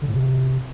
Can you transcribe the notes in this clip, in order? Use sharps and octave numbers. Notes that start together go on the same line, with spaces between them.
D3
A2
C3